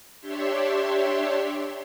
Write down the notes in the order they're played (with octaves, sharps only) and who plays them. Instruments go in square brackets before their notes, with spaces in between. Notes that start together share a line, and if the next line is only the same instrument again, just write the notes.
[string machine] D4 G4 C#5 E5 C6